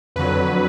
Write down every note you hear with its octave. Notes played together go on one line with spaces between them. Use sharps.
F2 D3 F#3 B4